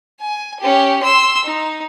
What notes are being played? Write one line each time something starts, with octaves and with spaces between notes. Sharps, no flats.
G#5
C#4 G4
C6 E6
D#4